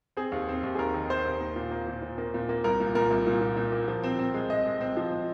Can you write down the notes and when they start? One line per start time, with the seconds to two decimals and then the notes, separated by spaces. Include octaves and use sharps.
0.17 C4 G#4
0.32 D#2
0.49 C4
0.63 D#2
0.75 G#4
0.79 D#2 A#4
0.94 D#3
1.10 C4 C5
1.25 D#2
1.41 A#3
1.56 A#2
1.71 A#3
1.87 A#2
2.02 A#2
2.18 A#3
2.34 A#2
2.49 A#3
2.64 C2 A#4
2.80 A#2
2.95 A#2 A#4
3.11 C2
3.27 A#2
3.41 A#2
3.57 A#2
3.72 A#3
3.88 F3
4.03 C4
4.19 C4
4.34 G#3
4.50 G#3 D#5
4.66 G#3
4.81 C4
4.97 F3
5.12 C4